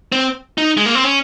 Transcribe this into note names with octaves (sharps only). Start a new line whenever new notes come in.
C4
D#4
G#3
A#3
C4
C#4